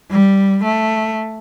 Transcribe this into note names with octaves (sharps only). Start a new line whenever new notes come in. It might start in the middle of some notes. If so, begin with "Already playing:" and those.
G3
A3